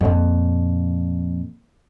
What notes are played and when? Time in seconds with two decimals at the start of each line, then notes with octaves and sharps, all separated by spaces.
0.01 F2 A#2